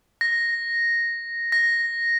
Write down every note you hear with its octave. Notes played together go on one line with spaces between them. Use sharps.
A#6
A#6